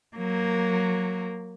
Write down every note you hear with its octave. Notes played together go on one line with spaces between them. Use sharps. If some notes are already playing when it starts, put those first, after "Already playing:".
F#3 A#3